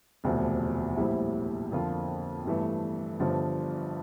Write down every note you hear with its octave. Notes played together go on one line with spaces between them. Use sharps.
E1 D2 C3 F3
A#1 A2 G3 C4 E4
F2 D3 F3 A#3 F4
G1 G2 E3 A3
G1 G2 D3 F3